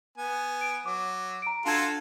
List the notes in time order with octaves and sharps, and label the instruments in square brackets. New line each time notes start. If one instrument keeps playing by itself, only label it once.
[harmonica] B3 G#5
[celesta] D7
[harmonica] F#3 [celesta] D6
[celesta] A#5 D7
[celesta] D4 A5 G#6 [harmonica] F4 F#4 A4